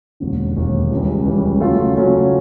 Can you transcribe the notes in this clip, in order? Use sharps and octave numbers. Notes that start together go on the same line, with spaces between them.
E1 D#2 D3
E1 D#2 D3
C#2 C#3 E3 G3
C#2 C#3 E3 G3
C#3 F#3 A3 C#4 F4
C#3 F#3 A3 C#4 F4